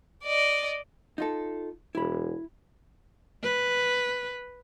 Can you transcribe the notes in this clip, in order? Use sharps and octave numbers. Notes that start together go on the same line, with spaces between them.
D5 D#5
D#4 F4 A4
E1 E4 B5
B4